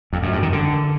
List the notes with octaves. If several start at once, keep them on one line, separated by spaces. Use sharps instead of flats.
F2
F#2
G2
D#3
D3